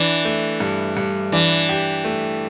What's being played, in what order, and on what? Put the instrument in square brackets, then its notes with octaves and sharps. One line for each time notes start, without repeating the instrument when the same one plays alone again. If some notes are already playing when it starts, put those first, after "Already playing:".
Already playing: [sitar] E3 [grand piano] D4
[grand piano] A3
G2
G2
[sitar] E3 [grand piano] D4
[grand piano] G4
A3